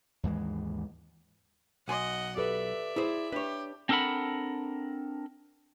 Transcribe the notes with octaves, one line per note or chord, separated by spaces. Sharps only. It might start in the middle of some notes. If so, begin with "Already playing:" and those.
D#2 G#2 E3 G#3
B1 D#5 F#5 G#5 C6
G4 A4 B4 D5 E5
E4 G#4 C5
D4 G4 B4 C#5
C4 D4 A4 A#4 F#5 B5